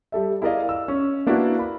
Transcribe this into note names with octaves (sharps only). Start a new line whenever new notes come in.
G3 A4 E5
E4 G#4 A#4 D5 D#5 F5
E6
C#4
A#3 D4 E4 F#4 B4
B5